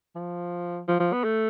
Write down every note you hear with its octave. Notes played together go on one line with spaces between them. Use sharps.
F3
F3
F3
B3
A3